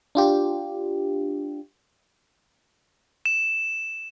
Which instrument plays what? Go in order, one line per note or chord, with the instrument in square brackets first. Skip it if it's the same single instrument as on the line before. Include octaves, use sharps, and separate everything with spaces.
[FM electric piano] D4 F4 G4
[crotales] E7